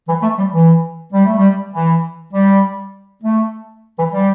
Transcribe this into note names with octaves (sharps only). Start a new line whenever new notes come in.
E3
A3
G3
E3
G3
A3
G3
E3
G3
A3
E3
G3